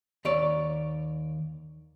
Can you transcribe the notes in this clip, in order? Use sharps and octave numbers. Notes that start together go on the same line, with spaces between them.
D#2 C#5 D5